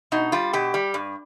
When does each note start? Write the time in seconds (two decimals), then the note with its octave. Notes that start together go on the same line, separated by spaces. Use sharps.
0.12 B2 D#4
0.32 G3 F4
0.53 B2 G4
0.74 G3
0.94 G2